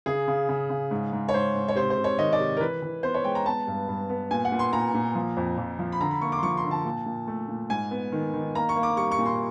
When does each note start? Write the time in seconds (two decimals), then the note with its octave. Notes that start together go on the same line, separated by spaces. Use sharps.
0.06 C#3 G#4
0.28 C#3
0.49 C#3
0.70 C#3
0.91 G#2
1.13 G#2
1.28 C#5
1.34 G#2 C5
1.55 G#2
1.68 C#5
1.76 C3 C5
1.90 C5
1.97 C3
2.04 C#5
2.18 D#3 D#5
2.32 D5
2.40 C3
2.57 A#4
2.61 E3 B4
2.82 E3
3.03 B3 C5
3.14 C#5
3.24 G#3 G5
3.35 A#5
3.46 B3 A5
3.67 G2
3.88 G2
4.09 B3
4.31 A#2 G#5
4.45 F#5
4.52 A#2
4.59 C6
4.73 A#2 A#5
4.94 A#2
5.15 F3
5.37 F2
5.58 F2
5.79 F3
5.92 B5
6.00 D3 A#5
6.11 B5
6.21 A#3 C#6
6.32 D6
6.38 C6
6.43 F3 C#6
6.57 C6
6.64 D3
6.71 A5
6.85 A#2
7.06 A#2
7.27 A3
7.48 A#2
7.70 G#2 G#5
7.91 B3
8.12 D#3
8.34 D#3
8.55 A#3 A#5
8.69 C#6
8.76 A#3
8.83 D6
8.97 G3 C#6
9.11 C#6
9.18 A#2
9.25 C6